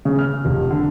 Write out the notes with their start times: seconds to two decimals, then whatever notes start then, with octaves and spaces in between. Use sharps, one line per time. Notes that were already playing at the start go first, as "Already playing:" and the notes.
0.05 C#3
0.19 F6
0.45 F1
0.70 D3